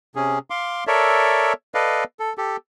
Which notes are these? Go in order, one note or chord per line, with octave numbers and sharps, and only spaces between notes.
C3 C#4 G#4
F5 C6 D6
A4 A#4 C#5 D5 E5
A4 B4 D5 D#5 F5
A4
G4 A4